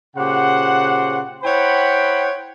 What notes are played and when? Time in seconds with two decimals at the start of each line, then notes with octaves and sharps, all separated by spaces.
0.16 A#2 C#3 G4 C5 F#5
1.43 E4 C5 C#5 F#5 G5 B5